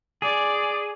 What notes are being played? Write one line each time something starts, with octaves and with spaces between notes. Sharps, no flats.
G#4 D5